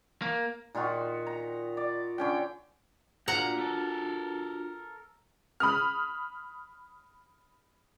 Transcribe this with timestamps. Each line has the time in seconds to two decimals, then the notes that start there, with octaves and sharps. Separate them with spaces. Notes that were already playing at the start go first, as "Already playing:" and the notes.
0.22 A#3
0.75 A#2 D#3 F4 F#4
1.27 A#5
1.77 D5
2.18 D3 C#4 G5
3.28 A#2 D4 F4 F#4 F#5 A#5
3.59 A4 A#4
5.60 B5 D#6 F6